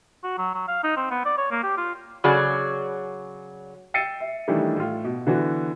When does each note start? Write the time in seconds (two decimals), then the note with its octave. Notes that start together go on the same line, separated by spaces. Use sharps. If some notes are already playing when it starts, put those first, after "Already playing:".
0.24 F#4
0.38 F#3
0.54 F#3
0.68 F5
0.84 D#4
0.97 C4
1.11 B3
1.25 D5
1.38 C#5
1.51 A#3
1.63 G4
1.78 F4
2.24 C#3 F#3 F#4 G#4 C#5 D5
3.94 G5 E6 A6 C7 C#7 D#7
4.20 E5
4.48 D#3 E3 G3 A3 D4
4.76 A2 F4
5.05 B2
5.27 D3 E3 B3 F#4